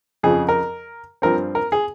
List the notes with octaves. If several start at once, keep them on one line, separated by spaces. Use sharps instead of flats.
F2 C#3 F3 G#4
A#4
G2 F3 C4 A#4
A#4
G#4